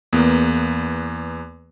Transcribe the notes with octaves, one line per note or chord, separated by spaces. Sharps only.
E2 A#3 B3